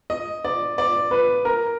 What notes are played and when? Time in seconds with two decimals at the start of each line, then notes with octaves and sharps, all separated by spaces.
0.10 D#5
0.45 D5
0.78 D5
1.11 B4
1.45 A#4